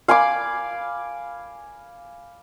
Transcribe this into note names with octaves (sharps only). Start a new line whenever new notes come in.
F5 G#5 B5 D6